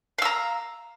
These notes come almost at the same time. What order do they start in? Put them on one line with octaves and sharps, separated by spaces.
F5 E6 A#5